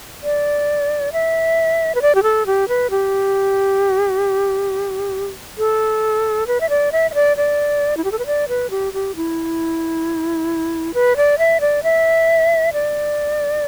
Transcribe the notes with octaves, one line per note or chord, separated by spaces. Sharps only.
D5
E5
B4
D5
G4
A4
G4
B4
G4
A4
B4
E5
D5
E5
E5
D5
D5
E4
G4
A4
B4
D5
B4
G4
G4
E4
B4
D5
E5
D5
E5
D5